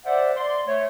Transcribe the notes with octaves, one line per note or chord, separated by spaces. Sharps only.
C5 D5 E5 F#5
D5 C6
A3 C#5